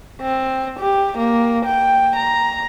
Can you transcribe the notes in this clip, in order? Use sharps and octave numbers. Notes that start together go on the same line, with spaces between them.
C4
G4
A#3
G5
A#5